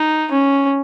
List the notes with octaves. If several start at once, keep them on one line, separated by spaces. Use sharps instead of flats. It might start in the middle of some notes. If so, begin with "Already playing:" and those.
Already playing: D#4
C#4